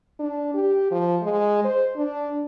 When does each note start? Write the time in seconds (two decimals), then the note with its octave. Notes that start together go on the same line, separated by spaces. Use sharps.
0.19 D4
0.54 G4
0.91 F3
1.22 G#3
1.65 C5
1.97 D4